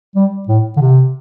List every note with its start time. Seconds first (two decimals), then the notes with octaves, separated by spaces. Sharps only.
0.15 G3
0.48 A2
0.77 D3
0.81 C3